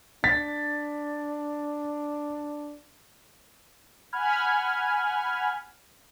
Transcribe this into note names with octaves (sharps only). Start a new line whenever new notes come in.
D4 A6 B6
F#5 G#5 B5 F6 G#6